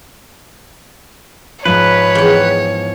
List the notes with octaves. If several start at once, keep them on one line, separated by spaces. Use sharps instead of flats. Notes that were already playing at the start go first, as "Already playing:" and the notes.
G#2 F3 B4 C#5
E2 G5